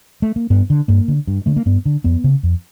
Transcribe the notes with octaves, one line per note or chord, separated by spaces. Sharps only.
A3
A#3
G2 B3
D3
G2 A#3
D3
G2
D3 A3
A#3
G2 B3
D3
F2 B3
C#3
F2